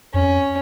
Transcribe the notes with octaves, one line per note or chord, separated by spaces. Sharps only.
F2 C#4